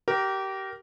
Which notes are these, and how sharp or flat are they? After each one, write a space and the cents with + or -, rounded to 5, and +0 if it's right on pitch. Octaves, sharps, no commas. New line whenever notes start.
G4 -25 A#4 +0